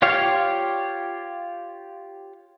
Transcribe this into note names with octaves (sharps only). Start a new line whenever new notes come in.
F4 G4 C#5 D5 F5